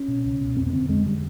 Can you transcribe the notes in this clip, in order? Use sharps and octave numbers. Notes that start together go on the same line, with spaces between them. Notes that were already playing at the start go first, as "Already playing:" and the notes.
Already playing: C#4
B2
C#2
B2
F2 C4
B3
D3 C4
F2 G#3
D3 G3